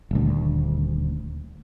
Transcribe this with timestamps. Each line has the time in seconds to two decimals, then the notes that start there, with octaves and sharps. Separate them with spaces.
0.11 D#1 D2